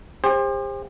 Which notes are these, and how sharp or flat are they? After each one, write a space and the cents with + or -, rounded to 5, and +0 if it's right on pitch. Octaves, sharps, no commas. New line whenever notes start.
G4 +40 C5 +20